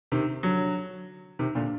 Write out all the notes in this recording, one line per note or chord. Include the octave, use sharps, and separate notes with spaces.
C3 D#3
D3 F#3
C3 D#3
A#2 D3